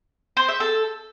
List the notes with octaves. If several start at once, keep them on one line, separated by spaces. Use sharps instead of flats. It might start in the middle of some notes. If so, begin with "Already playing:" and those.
C5
E5
A4